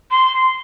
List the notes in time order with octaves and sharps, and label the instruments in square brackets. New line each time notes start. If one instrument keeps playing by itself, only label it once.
[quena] C6